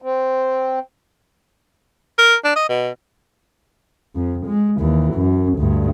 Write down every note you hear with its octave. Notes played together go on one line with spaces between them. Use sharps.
C4
A#4
D4
D#5
B2
F2
G#3
D#2 E3
F#2
D2 G2